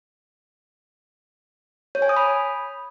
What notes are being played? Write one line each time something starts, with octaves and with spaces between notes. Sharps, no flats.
C#5
G#5
D#6
B5